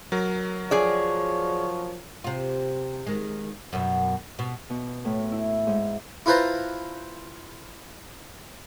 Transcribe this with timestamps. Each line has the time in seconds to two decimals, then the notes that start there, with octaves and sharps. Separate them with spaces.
0.12 F#3 A#4
0.71 F3 G#4 C#5 D5
2.24 C3 F4
3.07 D#3 G#3
3.73 F#2 B2
4.39 B2
4.70 B2
5.05 A2
5.32 E4
5.67 G#2
6.26 E4 F4 B4 C5 A5 A#5